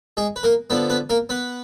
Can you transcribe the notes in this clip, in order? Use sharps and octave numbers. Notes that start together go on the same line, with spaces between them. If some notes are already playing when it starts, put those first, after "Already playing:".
G#3 G#4
B4
A#3 A#4
D3 F3 B3 B4
B3 B4
A#3 A#4
B3 B4